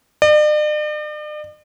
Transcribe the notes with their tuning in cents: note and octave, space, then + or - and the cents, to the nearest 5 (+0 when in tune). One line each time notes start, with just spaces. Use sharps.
D5 +45